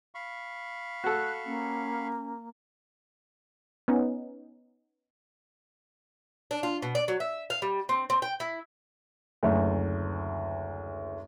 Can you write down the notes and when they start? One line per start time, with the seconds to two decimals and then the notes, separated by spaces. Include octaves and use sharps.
0.15 F5 B5 C#6
1.04 F#4 A4 F#6
1.45 A#3 C#4
3.88 B3 C#4 D#4
6.51 D4
6.63 F4
6.82 B2
6.95 D5
7.08 F#3
7.20 E5
7.50 F5
7.62 G3
7.89 C4
8.10 C4
8.22 G5
8.40 E4
9.43 F#1 D2